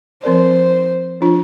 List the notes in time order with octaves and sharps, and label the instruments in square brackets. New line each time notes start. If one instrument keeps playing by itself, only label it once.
[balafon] F3 C4 A#4 D5 [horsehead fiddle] C5
[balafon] F3 D4 F4